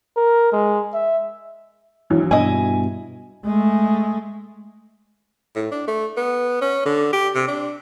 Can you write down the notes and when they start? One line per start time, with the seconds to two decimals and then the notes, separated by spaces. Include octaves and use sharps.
0.17 A#4
0.52 G#3
0.94 E5
2.10 A#1 E3 F#3
2.31 G2 B2 E4 D#5 G#5
3.45 G#3 A3
5.56 A2
5.71 D4
5.87 A3
6.17 B3
6.61 C#4
6.85 D3
7.13 G4
7.35 C3
7.48 D4